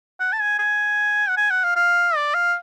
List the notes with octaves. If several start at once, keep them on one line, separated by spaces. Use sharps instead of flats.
F#5
A5
G#5
G#5
F#5
G#5
F#5
F5
F5
D5
F5